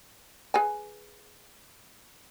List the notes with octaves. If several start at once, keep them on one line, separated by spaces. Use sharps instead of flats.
G#4 B4 G#5